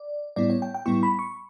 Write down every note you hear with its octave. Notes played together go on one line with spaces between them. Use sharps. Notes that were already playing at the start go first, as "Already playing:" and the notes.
Already playing: D5
A2 G3 B3 E4 D5
C#5
G5
G5
A2 G3 B3 E4 C#6
B5
C#6